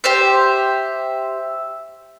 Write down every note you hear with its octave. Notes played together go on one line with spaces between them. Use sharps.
G4 C5 E5